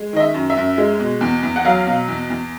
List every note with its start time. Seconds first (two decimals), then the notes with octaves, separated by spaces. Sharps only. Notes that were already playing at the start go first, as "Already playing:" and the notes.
Already playing: G#3
0.13 D#3 D#5
0.20 E5
0.34 F#2
0.50 E5
0.57 F#2
0.78 G#3
1.00 B2
1.21 E2
1.43 E2
1.56 F#5
1.65 F#3 F5
1.87 B2
2.08 E2
2.30 E2